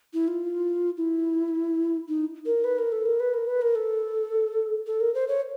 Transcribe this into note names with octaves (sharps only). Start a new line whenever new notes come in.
E4
F4
E4
D#4
A#4
B4
A#4
A4
A#4
B4
A#4
B4
A#4
A4
A4
A#4
C5
C#5